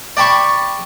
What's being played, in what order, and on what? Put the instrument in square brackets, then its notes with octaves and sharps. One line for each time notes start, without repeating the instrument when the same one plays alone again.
[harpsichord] D5 G5 A5 B5 C#6